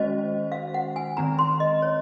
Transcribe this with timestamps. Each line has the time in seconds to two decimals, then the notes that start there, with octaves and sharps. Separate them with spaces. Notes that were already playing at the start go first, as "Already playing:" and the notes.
Already playing: D#3 G#3 C#4 F#4 C5 D#5
0.52 F5
0.74 F#5
0.96 G#5
1.17 D#3 G#3 C4 A#5
1.39 C6
1.60 D#5
1.82 C#5